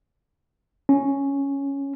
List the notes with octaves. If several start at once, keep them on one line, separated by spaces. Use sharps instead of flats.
C#4